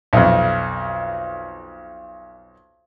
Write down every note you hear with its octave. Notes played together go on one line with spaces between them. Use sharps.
B1 F2